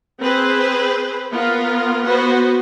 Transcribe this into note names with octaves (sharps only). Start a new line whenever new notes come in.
C4 G#4 B4 C5
B3 F4 A#4
B3 F#4 B4 C5